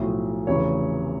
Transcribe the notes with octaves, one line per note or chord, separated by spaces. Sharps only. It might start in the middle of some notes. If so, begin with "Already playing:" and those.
Already playing: B1 A2 F3
F1 E2 C#3 C#5